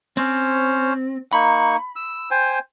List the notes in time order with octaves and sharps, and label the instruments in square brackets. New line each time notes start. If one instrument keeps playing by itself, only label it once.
[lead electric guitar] C4 [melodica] C#4 C5 C#5
[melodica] A#3 D#4 C#6 [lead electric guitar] B5
[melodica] E6
C5 G5 G#5